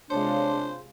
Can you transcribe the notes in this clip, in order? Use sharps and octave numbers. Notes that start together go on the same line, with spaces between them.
C3 G#3 D4 F4 C5 C#5